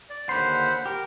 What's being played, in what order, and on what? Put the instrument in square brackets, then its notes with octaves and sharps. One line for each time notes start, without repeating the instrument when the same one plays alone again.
[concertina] D5
[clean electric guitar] D#2 D3 C6 [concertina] C5 F#5 B5
[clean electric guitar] G4 [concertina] A#4